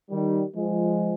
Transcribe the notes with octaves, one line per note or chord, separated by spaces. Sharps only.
D#3 G3
F3 G#3